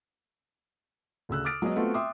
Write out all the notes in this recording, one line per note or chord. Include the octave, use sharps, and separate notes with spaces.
D2 C#3 E6 F#6
D6 D#6 F6 A6 D7
F#3 G#3 B3 D#5
A3 B3 C4 F4 F#4
E5 G5 C6 D6 D#6